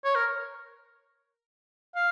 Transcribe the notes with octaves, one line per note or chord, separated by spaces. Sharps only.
C#5
A#4
F5